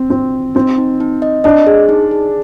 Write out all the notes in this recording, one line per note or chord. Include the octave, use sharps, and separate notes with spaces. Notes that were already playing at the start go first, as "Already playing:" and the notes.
Already playing: C4
C4 D4
F4
C4 D#4
D#4
D#4
D#5
D4 D#5
G#4
D#4
G#4